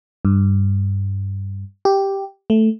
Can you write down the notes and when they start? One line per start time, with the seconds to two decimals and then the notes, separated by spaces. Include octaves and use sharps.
0.25 G2
1.85 G4
2.50 A3